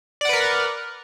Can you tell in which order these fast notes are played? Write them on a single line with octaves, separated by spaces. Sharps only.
D5 F#5 B4 A#4